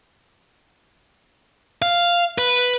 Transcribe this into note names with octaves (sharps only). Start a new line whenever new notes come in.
F5
B4